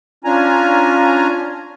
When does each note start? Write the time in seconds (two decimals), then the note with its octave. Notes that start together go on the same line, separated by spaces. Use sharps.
0.24 C#4 D4 F4 G#5 A#5